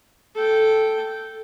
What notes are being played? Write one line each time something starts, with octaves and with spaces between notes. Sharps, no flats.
A4 G5